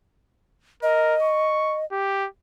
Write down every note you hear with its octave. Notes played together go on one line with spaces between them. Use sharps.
A#4 D#5
C#6
G4